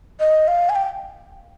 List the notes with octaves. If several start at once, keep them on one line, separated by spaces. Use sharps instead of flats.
D#5
F5
G#5
G5